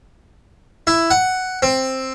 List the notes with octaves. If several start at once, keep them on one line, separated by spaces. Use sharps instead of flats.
E4
F#5
C4